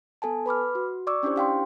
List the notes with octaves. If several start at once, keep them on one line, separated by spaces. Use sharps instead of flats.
B3 A4 G#5 A5
B4 B5 D6 F6
F#4
D5 C#6 D6 E6
C#4 D4 E4 G4 C5
G4 F5 G5 C6